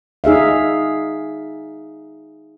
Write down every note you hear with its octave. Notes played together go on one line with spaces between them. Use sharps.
D#4 G#4 E5 F5